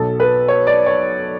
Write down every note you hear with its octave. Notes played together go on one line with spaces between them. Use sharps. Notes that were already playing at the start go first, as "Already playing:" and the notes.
Already playing: B1 B2 F#3 A4
B4
C#5
D5
C#5